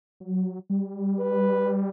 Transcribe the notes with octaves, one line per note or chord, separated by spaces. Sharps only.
F#3
G3
B4